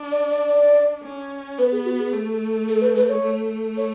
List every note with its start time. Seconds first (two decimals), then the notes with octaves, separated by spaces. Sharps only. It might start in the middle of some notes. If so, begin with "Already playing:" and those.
Already playing: D4
0.12 D5
0.31 D5
0.48 D5
1.03 C#4
1.58 B3 B4
1.72 G#4
1.85 F#4
1.99 G#4
2.13 A3
2.68 A4
2.81 B4
2.96 B4
3.09 C#5
3.23 A3
3.77 C#5